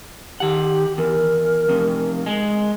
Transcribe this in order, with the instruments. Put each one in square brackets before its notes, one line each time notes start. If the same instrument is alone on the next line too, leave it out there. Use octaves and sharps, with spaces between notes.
[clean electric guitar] D#3 F#5 [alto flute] G4
[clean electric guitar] E2 [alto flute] A#4
[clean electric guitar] F2 C3
G#3